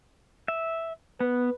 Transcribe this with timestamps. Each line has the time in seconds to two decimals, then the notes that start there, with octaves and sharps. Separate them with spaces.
0.48 E5
1.20 B3 B4